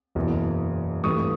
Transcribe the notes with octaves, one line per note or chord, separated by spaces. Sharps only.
F#1 E2 B2
G#1 G2 E3 A3 C#6 D#6